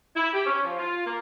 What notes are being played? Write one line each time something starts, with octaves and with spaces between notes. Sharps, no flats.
E4
G4
C#4
F3
F4
A#3